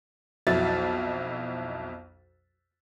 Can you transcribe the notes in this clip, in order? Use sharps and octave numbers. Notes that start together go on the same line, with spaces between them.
B1 F2 F#3 E4 A6